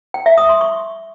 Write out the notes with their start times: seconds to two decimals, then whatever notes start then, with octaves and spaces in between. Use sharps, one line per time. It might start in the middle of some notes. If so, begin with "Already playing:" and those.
0.14 G5
0.26 E5
0.38 D#6
0.49 C6
0.61 C#6